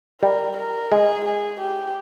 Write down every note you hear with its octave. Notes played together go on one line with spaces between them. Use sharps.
G3 A#4
A#4
G#3 G#4
G#4
G4